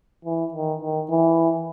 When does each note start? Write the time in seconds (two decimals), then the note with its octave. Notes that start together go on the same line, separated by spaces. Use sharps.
0.25 E3
0.54 D#3
0.82 D#3
1.10 E3